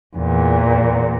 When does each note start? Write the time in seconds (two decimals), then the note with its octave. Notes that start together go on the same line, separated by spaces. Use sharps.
0.17 E2 A#2